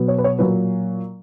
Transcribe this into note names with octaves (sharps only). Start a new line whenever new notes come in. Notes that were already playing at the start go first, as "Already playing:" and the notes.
Already playing: B2 F#3 B3
C#5
B4
C#5
A#2 F#3 A#3 B4